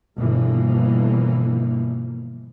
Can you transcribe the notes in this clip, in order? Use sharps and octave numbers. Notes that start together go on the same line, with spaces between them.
G1 B2 D3 E3 F3 A#3